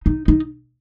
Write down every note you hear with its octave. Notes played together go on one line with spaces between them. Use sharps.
D#4
D#4